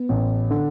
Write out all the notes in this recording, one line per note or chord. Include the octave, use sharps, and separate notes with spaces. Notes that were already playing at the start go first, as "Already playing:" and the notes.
Already playing: B3
A1
D3